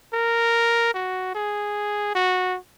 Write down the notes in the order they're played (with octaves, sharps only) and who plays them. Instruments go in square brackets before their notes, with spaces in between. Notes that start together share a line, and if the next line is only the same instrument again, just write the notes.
[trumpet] A#4
F#4
G#4
F#4